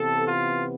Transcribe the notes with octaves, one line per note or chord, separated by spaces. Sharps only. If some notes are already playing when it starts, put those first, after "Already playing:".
Already playing: C3 E3 B3 A4
F4